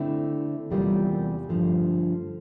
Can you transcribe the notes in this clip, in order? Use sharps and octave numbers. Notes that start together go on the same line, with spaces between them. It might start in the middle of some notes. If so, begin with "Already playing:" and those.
Already playing: D3 A3 C4 E4
E2 C3 G3 A#3 F4
G2 D3 F3 A3